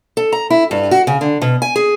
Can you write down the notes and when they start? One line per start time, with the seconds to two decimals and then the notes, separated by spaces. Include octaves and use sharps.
0.17 A4
0.32 A#5
0.50 E4
0.71 G2
0.91 F#4
1.07 C#3
1.21 D3
1.42 B2
1.62 G#5
1.76 G#4